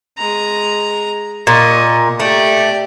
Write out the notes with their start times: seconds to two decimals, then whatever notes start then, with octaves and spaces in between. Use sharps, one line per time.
0.18 G#3 A#5
1.47 A#2 D#5 C#6
2.20 A3 G4 D5